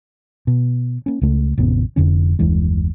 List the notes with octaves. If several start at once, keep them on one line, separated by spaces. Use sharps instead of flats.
B2
A#3 C#4
C#2 C#3 A3
A1 F2 C3 B3
F1 F2 D3 C#4
F#1 D#2 E3 G#3